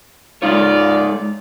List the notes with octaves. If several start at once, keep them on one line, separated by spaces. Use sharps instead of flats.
G#3 A#3 D#4 F4 C#5 D5